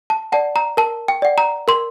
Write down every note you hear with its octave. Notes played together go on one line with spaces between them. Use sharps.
A5
D5 F#5 A5
A#5
A#4 A5
G5
D5 F#5
A#5
A#4 C6